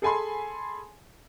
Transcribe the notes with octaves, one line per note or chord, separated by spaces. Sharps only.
G#4 A4 G#5 B5 C6